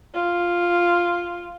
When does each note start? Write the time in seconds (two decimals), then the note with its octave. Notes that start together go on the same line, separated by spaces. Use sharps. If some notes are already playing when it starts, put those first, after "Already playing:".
0.15 F4